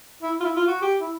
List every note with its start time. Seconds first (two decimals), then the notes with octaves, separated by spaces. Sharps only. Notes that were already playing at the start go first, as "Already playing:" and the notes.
0.22 E4
0.40 F4
0.44 E4
0.56 F4
0.67 F#4
0.82 G4
1.01 E4